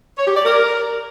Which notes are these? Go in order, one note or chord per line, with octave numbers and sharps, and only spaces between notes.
C#5
G4
D5
A#4